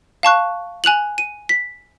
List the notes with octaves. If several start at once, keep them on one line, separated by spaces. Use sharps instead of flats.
F5 A5 C#6 F#6
G#5 F#6 F7 F#7
D#7
B6